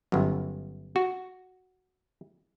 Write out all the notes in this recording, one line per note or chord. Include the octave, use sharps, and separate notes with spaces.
G1 F#2
F#4